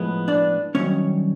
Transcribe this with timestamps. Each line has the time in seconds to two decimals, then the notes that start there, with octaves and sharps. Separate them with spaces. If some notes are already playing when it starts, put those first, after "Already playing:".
Already playing: A2 F3 G#3 B3
0.28 D4 D5
0.75 G2 D#3 F#3 C#4 C#5